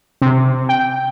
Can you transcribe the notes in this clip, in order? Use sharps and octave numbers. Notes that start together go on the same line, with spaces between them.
C3
G5